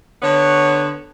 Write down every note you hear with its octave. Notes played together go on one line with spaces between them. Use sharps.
D3 B3 C#5